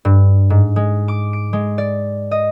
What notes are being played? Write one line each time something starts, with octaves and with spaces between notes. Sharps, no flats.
G2
G#2
G#3
D6
D7
G#3
D5
D#5